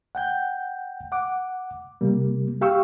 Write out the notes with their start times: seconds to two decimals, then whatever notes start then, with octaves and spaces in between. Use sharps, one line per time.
0.15 F#5 G5 G6
1.12 F#5 D6
2.01 C3 G3 A#3
2.61 G4 F5 G5 C#6 E6